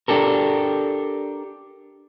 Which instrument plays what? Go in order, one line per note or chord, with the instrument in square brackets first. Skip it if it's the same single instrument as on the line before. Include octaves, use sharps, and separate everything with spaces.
[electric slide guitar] D4 G4 A4 A#4